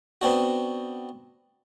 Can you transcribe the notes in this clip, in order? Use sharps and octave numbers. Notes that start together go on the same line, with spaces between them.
B3 C4 D4 F#4